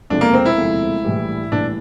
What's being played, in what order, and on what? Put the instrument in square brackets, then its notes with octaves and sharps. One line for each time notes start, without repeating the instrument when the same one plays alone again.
[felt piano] E1 D2 C3 F3 A3 [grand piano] D4
[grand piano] A#3
C4
E4
[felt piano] E1 D2 C3 F3 A3
A#1 A2 E3 G3
[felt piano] A#1 A2 E3 G3 [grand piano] D4